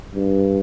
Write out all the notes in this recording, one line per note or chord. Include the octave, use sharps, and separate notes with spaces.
G2